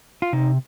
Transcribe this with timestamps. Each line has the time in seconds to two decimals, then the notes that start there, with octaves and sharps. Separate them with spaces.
0.22 F4
0.33 C3 D#4